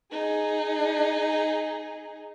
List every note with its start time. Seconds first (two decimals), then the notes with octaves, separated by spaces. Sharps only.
0.11 D#4 G#4